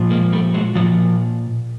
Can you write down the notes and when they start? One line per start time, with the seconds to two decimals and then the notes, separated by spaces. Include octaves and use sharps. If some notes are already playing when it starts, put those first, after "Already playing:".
Already playing: A#2 F3
0.10 G#3 A#3
0.32 G3 A3
0.54 F#3 G#3
0.75 F3 F#3
0.79 A#2